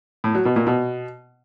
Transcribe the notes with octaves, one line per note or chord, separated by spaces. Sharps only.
A2
F#3
B2
A#2
B2